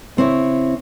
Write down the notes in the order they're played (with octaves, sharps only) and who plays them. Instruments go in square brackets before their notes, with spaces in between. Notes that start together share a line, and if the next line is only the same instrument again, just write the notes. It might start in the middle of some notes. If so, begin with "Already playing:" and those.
[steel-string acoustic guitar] C#3 C4 E4 C#5